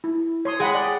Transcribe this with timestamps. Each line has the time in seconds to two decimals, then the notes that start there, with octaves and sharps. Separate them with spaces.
0.04 E4
0.45 C#5 C6 D#6
0.60 G#3 G#4 D#5 F#5 G5 B5
0.75 D5